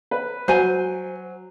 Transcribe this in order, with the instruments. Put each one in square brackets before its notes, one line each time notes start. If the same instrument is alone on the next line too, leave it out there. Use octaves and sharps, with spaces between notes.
[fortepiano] B4
[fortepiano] F#3 [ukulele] C5 G#5